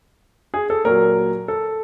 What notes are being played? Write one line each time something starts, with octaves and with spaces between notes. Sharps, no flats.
G#4
A4
A#2 F#3 A#4
A4